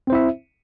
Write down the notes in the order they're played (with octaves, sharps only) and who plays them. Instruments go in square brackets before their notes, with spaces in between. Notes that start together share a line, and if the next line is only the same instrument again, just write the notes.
[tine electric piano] C4
C5
E4
E5